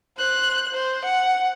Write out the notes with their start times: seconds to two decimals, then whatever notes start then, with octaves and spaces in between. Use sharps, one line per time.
0.18 C5 F#6
0.74 C5
1.05 F#5